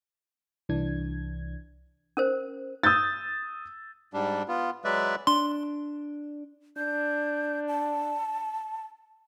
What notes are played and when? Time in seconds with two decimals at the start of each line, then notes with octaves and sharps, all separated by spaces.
0.69 C2 E3 D4 G#6
2.17 C#4 A#4 C5
2.83 D#6 E6 G6 A6
4.14 G#2 G3 D4
4.48 B3 F4
4.85 F#3 G#3 B4 D5 E5
5.27 D4 C6
6.77 D4 G6
7.68 A5